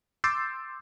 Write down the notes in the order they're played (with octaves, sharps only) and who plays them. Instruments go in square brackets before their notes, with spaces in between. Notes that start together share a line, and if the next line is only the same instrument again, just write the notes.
[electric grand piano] C6 D6 E6 G6 A6 C7